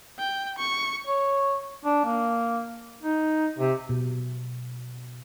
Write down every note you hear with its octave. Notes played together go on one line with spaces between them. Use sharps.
G5
C#6
C#5
D4
A#3
D#4
C3
B2